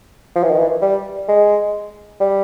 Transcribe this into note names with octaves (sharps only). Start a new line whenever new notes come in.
F3
E3
D#3
E3
G3
G#3
G3